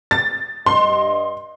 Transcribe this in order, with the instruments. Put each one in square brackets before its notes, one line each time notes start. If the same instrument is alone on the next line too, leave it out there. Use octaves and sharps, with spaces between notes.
[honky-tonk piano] A6
[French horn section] G2 D#5 [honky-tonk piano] C6